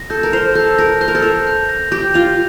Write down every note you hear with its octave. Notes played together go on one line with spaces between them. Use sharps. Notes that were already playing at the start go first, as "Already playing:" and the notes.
Already playing: A#6
A4 G6
A#4
C5 F7
A4 G6
A#4 A#6
C5 G6
A#4
A4
A#4 F7
G6
A#6
G4 G6
F4 F7